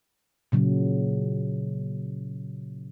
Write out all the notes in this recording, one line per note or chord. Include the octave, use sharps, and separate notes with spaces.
A#2 C#3 F#3